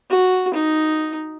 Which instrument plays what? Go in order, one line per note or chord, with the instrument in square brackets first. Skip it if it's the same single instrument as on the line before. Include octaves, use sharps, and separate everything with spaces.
[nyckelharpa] F#4
D#4